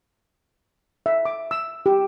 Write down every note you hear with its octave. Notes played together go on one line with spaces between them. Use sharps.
E5
D6
E6
G4